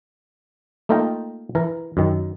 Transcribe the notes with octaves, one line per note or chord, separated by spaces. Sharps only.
A3 A#3 D#4 F4 A#4 G5
E3 A#4
F#2 D#3